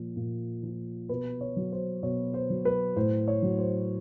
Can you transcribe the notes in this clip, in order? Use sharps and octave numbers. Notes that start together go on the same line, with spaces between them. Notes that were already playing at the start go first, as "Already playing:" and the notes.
Already playing: A#2 F3
A#2
F3
B2 B4
C#5
F#3
C5
B2 C#5
C5
F#3
B4
A2 C5
C#5
F#3
C5